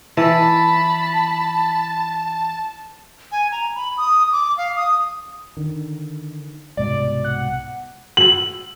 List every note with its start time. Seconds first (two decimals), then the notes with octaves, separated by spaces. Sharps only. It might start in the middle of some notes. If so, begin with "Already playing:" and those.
0.17 E3 A5 B5
3.32 G#5
3.52 A#5
3.75 B5
3.98 D#6
4.32 D6
4.58 F5
4.76 D#6
5.57 D3 D#3
6.77 C2 G#2 B2 D5
7.24 F#5
8.17 F#7